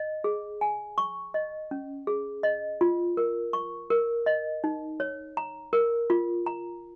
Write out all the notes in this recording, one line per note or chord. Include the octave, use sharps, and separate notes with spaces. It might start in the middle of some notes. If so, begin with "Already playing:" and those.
Already playing: D#5
G#4
G#5
C#6
D#5
C#4
G#4
D#5
F4
A#4
C#6
A#4
D#5
D#4
C#5
A#5
A#4
F4
A#5